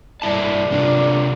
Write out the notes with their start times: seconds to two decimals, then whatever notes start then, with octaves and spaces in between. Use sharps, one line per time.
0.22 G2 E4 D5 A5
0.70 C3 D4 F4